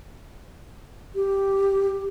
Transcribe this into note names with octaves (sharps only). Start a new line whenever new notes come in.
G4